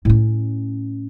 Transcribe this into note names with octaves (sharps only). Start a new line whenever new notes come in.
A2 C#4